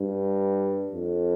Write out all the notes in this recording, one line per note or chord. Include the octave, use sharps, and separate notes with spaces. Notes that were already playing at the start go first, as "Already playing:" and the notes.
Already playing: G2
F2